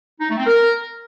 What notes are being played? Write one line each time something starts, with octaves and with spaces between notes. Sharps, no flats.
D#4
A3
C4
A#4